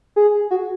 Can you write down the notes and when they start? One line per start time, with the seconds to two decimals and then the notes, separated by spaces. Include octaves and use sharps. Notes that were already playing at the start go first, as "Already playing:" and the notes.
0.16 G#4
0.51 F#4